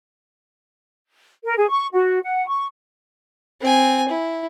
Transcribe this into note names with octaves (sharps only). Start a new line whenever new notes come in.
A#4
G#4
C#6
F#4
F#5
C#6
C4 G#5
E4